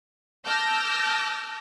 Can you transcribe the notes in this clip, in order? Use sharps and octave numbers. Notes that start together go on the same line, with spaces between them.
A5 D6 E6 F6 G6 A#6